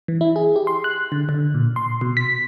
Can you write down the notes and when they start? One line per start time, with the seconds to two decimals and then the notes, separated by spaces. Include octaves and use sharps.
0.08 E3
0.21 E4
0.36 G#4
0.56 G4
0.67 C6
0.84 F#6
1.12 D3
1.29 D3
1.54 A#2
1.76 C6
2.01 B2
2.17 B6